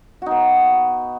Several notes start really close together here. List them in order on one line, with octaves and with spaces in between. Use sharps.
F#4 D#4 B3